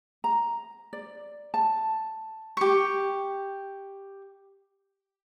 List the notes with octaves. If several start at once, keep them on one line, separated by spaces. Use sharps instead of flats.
A#5
D5
A5
G4 C#6